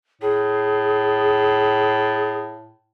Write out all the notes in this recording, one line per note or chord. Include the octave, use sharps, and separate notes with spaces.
A2 G#4